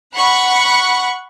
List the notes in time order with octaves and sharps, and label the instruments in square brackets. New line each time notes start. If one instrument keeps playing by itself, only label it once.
[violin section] F#5 B5 C#6 F#6